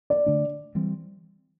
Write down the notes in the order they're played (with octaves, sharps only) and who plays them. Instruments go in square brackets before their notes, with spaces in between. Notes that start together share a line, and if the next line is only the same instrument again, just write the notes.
[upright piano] D5
[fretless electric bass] D3 A3 D4
E3 G3 C4